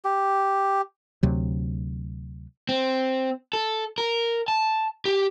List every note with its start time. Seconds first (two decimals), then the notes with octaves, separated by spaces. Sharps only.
0.05 G4
1.23 D2 C3 F#3
2.69 C4
3.53 A4
3.98 A#4
4.48 A5
5.05 G4